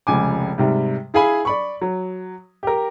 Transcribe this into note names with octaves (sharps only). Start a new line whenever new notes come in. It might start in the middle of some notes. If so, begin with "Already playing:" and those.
F1 C#2 G#5 D6
G#2 C3 G3
E4 G#4 F5 G#5 B5
D5 B5 C#6
F#3
G4 A#4